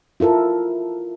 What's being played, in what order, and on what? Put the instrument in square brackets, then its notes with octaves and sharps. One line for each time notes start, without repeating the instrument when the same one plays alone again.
[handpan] E4 F4 A4 A#4